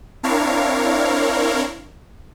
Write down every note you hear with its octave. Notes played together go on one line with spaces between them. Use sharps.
C4 D4 E4 A#4 C#5 F5